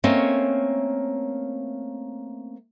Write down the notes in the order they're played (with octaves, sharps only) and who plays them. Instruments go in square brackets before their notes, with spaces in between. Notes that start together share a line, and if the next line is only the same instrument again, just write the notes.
[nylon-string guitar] A3 A#3 C4 C#4 C#5 D#5